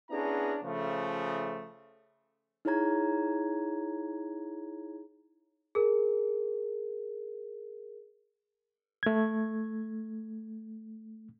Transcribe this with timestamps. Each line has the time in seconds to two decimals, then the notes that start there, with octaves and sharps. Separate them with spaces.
0.10 B3 C#4 D4 E4 G#4 A#5
0.64 C#3 F3 A3
2.65 D#4 E4 G#4 C#5 A#5 G#6
5.75 G#4 A#4
9.03 A3 G#6